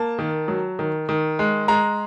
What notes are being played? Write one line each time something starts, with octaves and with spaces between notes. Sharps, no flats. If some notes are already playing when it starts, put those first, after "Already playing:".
Already playing: A#3 A5
D#3
F#3
D#3
D#3
G#3
G#3 A#5